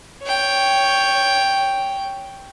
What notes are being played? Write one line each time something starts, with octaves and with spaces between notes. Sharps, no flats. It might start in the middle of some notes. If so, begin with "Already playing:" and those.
C#5 G5